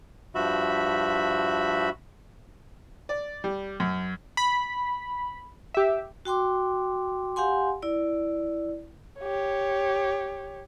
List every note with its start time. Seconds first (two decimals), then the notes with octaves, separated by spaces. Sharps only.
0.35 G2 F3 F#4 E5 B5
3.09 D5
3.44 G3
3.80 F#2
4.37 B5
5.74 G4 E5
6.25 F#4 G5 C6 D6
7.36 G4 F5 F#5 G#5 C6
7.82 E4 D5
9.20 G4 C#5